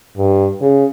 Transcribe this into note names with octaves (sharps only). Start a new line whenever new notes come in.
G2
C#3